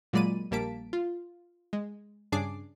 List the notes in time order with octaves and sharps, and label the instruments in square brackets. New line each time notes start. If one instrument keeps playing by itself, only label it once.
[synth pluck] A#2 F#3 G#3 D5 B5 D#7
A#1 G3 A#3 A5 B6 D7
F4
G#3
G2 C#3 D4 G#4 D6 C7